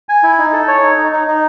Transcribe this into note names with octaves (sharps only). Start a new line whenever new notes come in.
G#5
E4
D#4
A4
C#5
D#4
D#4
D#4
D#4